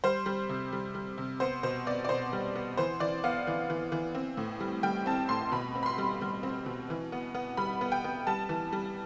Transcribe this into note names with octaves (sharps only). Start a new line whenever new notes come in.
G3 C5
G3
C3
G3
G3
C3
B3 C5
B2 C5
B3 D5
D5
B2 C5
G3
B3
E3 C5
E3 D5
B3 F5
E3
E3
E3
C4
A2
G3
G3 G5
C4 A5
A2 C6
B2 B5
C4
B5
C6
G3
G3
C4
B2
E3
B3
B3
G3 B5
B3
G5
B3
G3 A5
E3
G3